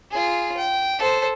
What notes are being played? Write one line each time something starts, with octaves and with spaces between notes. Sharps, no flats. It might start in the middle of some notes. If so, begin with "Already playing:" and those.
F4 G#4
G5
A4 C5